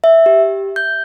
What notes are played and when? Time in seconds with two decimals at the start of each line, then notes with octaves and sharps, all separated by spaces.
0.04 E5
0.26 G4
0.76 G6